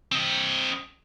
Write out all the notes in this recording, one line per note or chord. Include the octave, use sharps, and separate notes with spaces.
C4 D#5